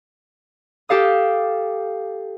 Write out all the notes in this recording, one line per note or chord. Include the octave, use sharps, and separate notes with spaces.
G4 A4 F5 D#6